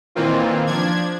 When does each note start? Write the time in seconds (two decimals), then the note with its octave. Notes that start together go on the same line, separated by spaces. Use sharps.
0.15 A#2 D#3 E3 A#3 C4 F4
0.67 F3 D4 G#6